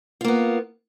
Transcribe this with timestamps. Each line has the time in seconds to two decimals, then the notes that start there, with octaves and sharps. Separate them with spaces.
0.21 F4
0.24 A#3
0.28 B3